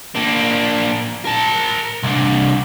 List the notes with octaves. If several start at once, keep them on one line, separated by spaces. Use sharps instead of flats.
A#3 D4
A#4 A5
C2 D4